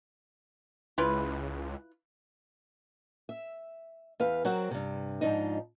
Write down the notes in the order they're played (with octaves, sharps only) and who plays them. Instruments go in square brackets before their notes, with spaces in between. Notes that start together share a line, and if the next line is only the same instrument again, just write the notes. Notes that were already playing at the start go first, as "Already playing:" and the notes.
[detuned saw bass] C#2 [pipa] E4 F4 B4
[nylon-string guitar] E5
E2 B4 F5
F#3 C4 A#4 F#5
G2 C3
G#2 F3 D4 D#4